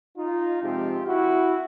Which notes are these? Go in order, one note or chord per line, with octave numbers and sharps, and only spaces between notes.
D#4 F4
C3 F3 G#3 C4 F4 G4
E4 F#4